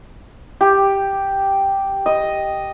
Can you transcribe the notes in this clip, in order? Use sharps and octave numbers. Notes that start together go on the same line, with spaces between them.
G4
D#5